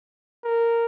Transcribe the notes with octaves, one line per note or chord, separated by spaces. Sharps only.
A#4